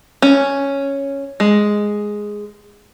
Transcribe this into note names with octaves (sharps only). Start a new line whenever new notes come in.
C#4
G#3